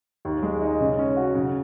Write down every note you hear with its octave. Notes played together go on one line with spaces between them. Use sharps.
D#2
G#3
D#4
C#3
C#4
F#4
C#3